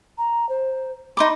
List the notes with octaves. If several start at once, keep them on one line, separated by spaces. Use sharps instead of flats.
A#5
C5
D#4 B5 C6 D6